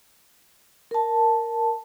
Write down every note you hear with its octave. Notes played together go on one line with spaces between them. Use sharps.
A#4 A5